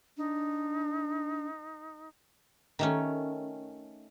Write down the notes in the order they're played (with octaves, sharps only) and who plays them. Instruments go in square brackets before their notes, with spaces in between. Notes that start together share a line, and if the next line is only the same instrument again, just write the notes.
[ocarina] D4 [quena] D#4
[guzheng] D#3 A3 C#4